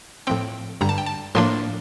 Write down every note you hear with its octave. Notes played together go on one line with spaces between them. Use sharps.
A2 F3 C4 G5
G2 D3 G3 A#5
A5
G5
A5
A2 F3 A#3 D4 C6